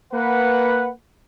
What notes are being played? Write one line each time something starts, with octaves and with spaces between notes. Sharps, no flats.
A#3 B4 F#5